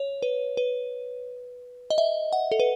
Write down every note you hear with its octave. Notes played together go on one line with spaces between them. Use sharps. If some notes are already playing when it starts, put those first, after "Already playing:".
Already playing: C#5
B4
B4
D#5
E5
F#5
A4
B4